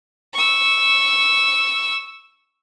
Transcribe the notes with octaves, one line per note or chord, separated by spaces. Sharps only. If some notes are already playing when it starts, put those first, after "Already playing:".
C#6 E6